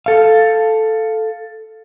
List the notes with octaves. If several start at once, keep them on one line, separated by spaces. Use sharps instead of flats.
A4 F5